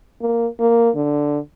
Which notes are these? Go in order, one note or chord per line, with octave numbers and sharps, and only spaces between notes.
A#3
A#3
D3